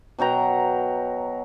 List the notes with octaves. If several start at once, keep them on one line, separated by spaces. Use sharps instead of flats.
B2 F#3 G5 A#5